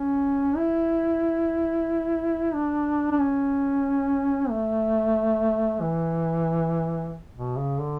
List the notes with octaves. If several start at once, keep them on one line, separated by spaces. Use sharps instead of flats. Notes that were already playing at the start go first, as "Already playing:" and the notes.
Already playing: C#4
E4
D4
D4
C#4
A3
E3
B2
C#3
D3